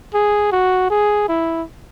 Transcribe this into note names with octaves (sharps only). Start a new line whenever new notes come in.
G#4
F#4
G#4
E4